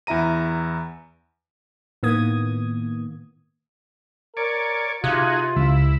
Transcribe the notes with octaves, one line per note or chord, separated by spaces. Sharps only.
E2 E4 E5 A#5 D#7
A2 D#3 A#3 B3 D#6 G#6
A#4 C#5 D5
C3 D#4 F4 F#4 G#4
C#2 E4